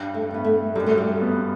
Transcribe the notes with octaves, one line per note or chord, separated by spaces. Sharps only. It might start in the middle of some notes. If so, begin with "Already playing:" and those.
Already playing: G2
A3
G2
B3
A3
F#2 G3
A3
G3
B3